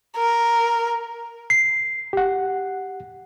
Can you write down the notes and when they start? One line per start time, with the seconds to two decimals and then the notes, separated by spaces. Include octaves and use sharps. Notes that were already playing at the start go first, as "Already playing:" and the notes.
0.17 A#4
1.50 C7
2.13 G4 F#5